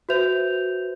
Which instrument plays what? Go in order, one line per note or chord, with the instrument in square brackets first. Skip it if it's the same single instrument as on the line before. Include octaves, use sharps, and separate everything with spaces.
[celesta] F#4 B4 C5 E5 G6 F7